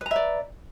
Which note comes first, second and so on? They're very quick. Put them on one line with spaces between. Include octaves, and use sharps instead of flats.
B4 A#5 E5 D5